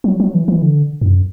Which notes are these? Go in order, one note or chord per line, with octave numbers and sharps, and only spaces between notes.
F#3
F#3
E3
E3
D3
F#2